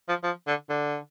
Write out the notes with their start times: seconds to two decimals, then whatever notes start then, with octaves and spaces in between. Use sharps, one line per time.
0.09 F3
0.23 F3
0.47 D3
0.69 D3